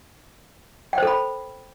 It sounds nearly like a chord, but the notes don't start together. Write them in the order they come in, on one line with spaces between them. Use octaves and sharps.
G5 C5 A4 B5